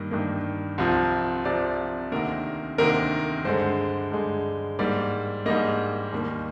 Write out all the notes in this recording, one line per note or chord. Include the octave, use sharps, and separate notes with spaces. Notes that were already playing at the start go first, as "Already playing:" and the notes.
Already playing: G2 D#3 A#3
G2 D#3 A#3
C2 C3 F3
C2 C3 F3 D5
D2 C3 D#3 A#3 A#4
D2 C3 D#3 A#3 A#4
G2 D3 G#3 C5
G2 D3 G#3
G#2 G3 A#3 D5
G#2 G3 A#3 D#5
D#2 D#3 G3 A#3